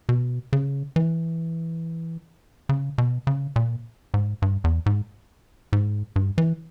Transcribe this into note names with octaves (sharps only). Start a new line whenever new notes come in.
B2
C#3
E3
C#3
B2
C#3
A#2
G#2
G2
E2
G#2
G#2
G2
E3